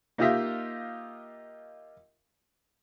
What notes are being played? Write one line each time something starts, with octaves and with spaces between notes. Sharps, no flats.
A#3 D#4 F4 G4 D#5 E5